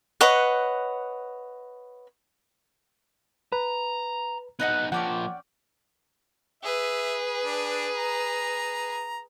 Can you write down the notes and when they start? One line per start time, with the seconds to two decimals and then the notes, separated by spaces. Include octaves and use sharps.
0.21 B4 C#5 D#5 F#5
3.52 B4 A#5
4.60 B3 D#4 B4 D#5 F#5
4.92 F3 A#3 C#4 D5 F#5 G5
6.64 G#4 B4 E5
7.45 D4
7.96 A#5